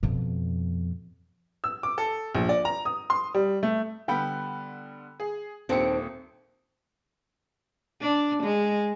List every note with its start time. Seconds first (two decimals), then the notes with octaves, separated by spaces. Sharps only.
0.03 F2 B2
1.64 E6
1.83 D6
1.98 A4
2.35 A#1
2.49 D5
2.65 A#5
2.85 D#6
3.10 C6
3.34 G3
3.63 A3
4.08 D3 G3 B3 G5 B5
5.20 G#4
5.69 D#1 D#2 C4 D4 G4 C#7
8.01 D4
8.43 G#3